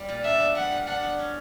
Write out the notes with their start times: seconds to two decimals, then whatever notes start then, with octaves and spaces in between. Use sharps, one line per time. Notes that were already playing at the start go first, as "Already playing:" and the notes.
Already playing: G3
0.09 A#2
0.24 D4 E5
0.40 B3
0.55 G3 F#5
0.72 A#2
0.87 D4 F#5
1.03 B3
1.19 C#4